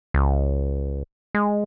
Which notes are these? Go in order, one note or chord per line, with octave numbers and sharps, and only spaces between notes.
C#2
G#3